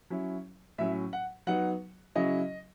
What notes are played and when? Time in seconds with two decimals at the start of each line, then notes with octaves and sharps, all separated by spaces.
0.10 F#3 C#4 E4
0.78 A2 F#3 C#4 E5
1.13 F#5
1.47 F#3 B3 D#4 F#5
2.15 C#3 F#3 C#4 E4 D#5